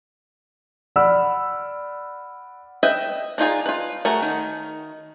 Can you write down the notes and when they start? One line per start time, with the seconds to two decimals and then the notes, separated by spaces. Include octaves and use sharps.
0.96 D5 F#5 B5 E6 F6
2.83 B4 D#5 E5 G5
3.38 D4 D#4 F4 G#4
3.66 F4 B4
4.05 A3 F#4 G#4 A#4
4.22 D#3